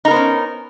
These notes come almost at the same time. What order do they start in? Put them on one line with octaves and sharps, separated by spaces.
D#4 A#4 B3 C5 C#4